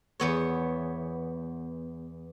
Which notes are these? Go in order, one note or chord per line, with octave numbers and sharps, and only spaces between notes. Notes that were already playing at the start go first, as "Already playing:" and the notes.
E2 B3 C#5